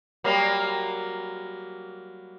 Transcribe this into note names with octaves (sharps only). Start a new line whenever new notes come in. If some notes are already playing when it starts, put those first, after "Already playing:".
F#3 G3 A#3